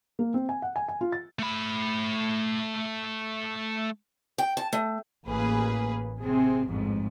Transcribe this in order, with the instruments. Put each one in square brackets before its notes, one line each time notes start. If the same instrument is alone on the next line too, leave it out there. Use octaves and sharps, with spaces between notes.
[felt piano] A#3
C4
G#5
F#5
G#5
G#5
F4
A6
[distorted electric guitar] A3 B5
[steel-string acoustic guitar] G5
A5
A3
[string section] A1 A#3 G#4 B4
C3 C4 G#4
A1 F2 G#2